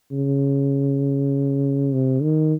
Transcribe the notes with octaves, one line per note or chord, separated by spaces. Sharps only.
C#3
C3
D#3